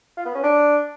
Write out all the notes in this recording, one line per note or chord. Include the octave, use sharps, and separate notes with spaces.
F4
B3
C#4
D4